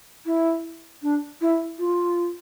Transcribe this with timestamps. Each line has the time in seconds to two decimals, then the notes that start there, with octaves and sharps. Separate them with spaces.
0.26 E4
1.03 D4
1.41 E4
1.79 F4